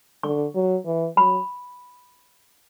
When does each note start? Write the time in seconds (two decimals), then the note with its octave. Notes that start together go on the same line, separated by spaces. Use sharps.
0.23 D3 C#6
0.55 F#3
0.85 E3
1.17 F#3 B5